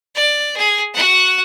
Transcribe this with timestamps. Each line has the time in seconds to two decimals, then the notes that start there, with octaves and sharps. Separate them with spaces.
0.15 D5
0.57 G#4
0.93 F#4 F#5